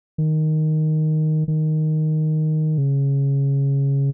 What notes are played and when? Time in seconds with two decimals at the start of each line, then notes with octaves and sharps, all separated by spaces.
0.18 D#3
1.48 D#3
2.78 C#3